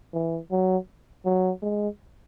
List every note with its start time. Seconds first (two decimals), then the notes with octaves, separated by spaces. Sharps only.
0.13 E3
0.51 F#3
1.25 F#3
1.62 G#3